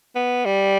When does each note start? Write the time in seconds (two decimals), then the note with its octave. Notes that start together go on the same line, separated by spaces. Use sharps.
0.15 B3
0.45 G3